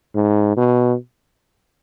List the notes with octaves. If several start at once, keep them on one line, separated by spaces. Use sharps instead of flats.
G#2
B2